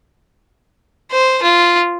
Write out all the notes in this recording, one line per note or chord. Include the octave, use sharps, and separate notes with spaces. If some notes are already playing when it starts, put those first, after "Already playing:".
C5
F4